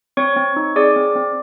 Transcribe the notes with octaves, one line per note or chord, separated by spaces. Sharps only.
C4 C#5 C#6
C4
D#4
G#4 D5 D6
C4
C4